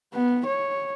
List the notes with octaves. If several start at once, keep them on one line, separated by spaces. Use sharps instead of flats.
B3
C#5